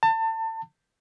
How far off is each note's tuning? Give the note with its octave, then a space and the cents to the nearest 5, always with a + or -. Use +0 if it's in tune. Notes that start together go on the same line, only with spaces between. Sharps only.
A5 +30